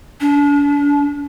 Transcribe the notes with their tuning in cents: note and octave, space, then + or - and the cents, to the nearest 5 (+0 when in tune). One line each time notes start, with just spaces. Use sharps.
D4 -40